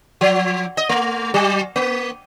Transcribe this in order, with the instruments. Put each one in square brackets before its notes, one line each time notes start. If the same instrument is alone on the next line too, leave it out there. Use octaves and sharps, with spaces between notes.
[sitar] F3
D#5
A3
F#3
A#3